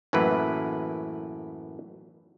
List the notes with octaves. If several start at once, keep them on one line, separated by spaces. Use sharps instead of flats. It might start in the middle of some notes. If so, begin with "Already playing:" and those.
F#2 A2 E3 A#3 B4